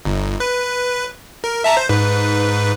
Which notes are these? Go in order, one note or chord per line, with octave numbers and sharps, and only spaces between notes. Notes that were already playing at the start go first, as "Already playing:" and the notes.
G1
B4
A#4
E5 A5 A#5
C5
G#2 B4